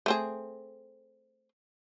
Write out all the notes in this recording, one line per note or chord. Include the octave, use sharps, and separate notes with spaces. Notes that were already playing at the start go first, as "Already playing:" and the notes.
A3 C4 G#4